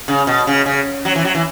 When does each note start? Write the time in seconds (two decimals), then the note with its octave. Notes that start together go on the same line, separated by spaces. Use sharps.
0.08 C#3
0.27 B2
0.47 C#3
0.66 C#3
1.05 F#3
1.16 E3
1.25 F#3
1.35 E3